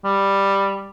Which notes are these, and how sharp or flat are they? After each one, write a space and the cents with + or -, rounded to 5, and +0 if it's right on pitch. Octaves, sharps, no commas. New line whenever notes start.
G3 +5